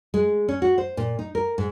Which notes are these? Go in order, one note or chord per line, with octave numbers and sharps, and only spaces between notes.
G#3
C#4
F#4
C5
A#2
D#4
A#4
G#2